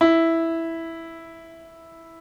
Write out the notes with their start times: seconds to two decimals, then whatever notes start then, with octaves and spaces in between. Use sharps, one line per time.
0.01 E4